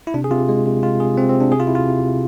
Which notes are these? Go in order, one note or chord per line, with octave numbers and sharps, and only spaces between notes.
E4
C3 D4
G#4
C3 F4
G#3
C3
G#3 F4
C3 G#4
C3 C4
C4
C3
D4
C3 G#4
F4
C3 E4
F4
C3
C3